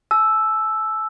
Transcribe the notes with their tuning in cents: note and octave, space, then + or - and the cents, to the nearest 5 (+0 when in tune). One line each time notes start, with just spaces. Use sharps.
A5 -45 E6 +0